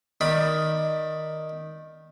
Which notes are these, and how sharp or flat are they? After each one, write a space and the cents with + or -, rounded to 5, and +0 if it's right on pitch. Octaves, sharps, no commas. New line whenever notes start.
D#3 +0 D5 +15 B5 -5